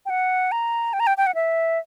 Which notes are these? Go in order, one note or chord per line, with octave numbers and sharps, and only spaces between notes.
G5
F#5
A#5
G5
A#5
G5
G5
F#5
E5